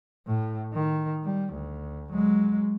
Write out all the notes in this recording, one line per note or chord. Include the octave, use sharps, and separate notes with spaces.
A2
D#3
G3
D2
F#3 G#3